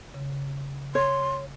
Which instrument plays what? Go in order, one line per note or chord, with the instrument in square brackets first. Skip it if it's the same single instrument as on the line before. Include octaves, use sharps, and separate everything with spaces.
[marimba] C#3
[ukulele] C#5 [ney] C6